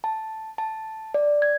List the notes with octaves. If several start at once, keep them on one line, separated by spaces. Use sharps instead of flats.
A5
A5
D5
G#6